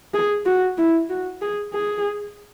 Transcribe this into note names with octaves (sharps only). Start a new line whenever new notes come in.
G#4
F#4
E4
F#4
G#4
G#4